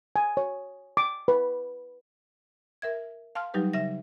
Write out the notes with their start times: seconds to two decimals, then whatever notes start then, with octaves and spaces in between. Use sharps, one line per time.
0.16 G#5
0.37 C#5
0.97 D6
1.28 B4
2.82 A#4 E5 G#6
3.35 F5 A5 C6 F6
3.54 F#3 G3 D#4 G4 B4
3.73 C#3 E5 A#6